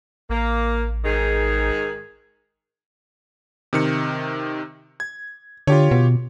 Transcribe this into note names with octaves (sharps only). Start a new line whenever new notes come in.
A1 A#3
G#2 D#3 G#4
C3 D#3 C#7
G#6
D3 F4 G4 C#5
B2